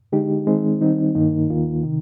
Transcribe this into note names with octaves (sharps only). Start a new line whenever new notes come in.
D3 G#3 D#4 G4
D#3 G#3 C4 D#4
D#3 G3 C4 D#4
G2 D#3 A#3 D#4
D#2 D#3 A#3 F4
C3 D#3